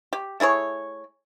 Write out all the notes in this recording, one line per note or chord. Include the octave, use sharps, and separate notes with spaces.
G4
A3 E4 G#4 C#5